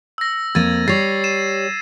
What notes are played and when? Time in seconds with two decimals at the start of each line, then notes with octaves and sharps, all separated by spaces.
0.18 E6 A#6
0.55 F2 A#3 G#6 A6 D#7
0.88 G3 C#5 G#6 A6 C7
1.24 D#7 E7